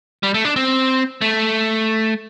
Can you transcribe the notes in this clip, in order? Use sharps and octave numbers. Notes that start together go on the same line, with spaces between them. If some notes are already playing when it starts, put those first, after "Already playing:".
G3
A3
D4
C4
A3